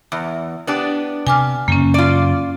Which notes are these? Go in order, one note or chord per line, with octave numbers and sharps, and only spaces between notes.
E2
B3 D4 G4
C3 G#5 D6 F6
F#2 C#3 A#3 C#4
F4 D5